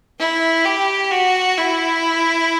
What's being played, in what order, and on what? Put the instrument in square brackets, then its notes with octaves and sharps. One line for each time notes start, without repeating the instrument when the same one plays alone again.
[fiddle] E4
G4
F#4
E4